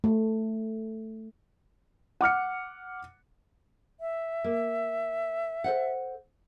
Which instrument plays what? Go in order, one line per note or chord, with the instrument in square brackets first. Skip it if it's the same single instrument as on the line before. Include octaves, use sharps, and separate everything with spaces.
[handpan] A3
[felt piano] F#5 D6 F6 C#7
[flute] E5
[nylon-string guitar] A#3
A4 C5 F#5